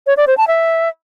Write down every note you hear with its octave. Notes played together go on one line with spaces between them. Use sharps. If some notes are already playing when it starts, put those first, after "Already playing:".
C#5
D5
C5
A5
E5